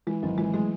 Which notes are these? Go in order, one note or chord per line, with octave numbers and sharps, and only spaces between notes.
E3 G#3
G#1 F#3
E3 G#3
F#3 G#3 A3